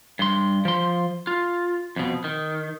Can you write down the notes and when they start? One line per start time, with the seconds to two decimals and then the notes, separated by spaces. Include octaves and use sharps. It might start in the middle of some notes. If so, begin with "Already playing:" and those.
0.19 G2 C6
0.65 F3 C6
1.27 F4
1.96 F2 B2
2.24 D#3